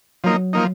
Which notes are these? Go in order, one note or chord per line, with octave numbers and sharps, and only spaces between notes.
F3 F#3 A#3 D#4
F3 A#3 D#4